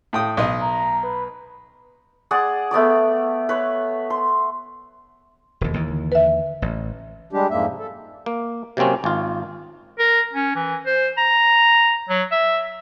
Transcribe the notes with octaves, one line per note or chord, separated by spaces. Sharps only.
A2 G5 D#6
B1 D#5
A#5
B4
G#4 D5 F#5
A3 B3 D5 D6
B4 C#5
C6
E1 D#2
D#2 D#3 E3
D3
B4 E5
A1
G3 G#3 D4 G4
F2 G#2 G#3 A#3 E5
C3
A4
A#3
C3 F#3 A#3 C4 C#4
G#1 F4
A#4
C#4
E3
C5
A#5
F#3
E5